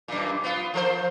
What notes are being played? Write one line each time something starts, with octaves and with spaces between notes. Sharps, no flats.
F#2 A#2
B3 F4
F3 A#4 C5